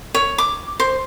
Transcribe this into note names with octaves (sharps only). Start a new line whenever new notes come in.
C#5
D6
C5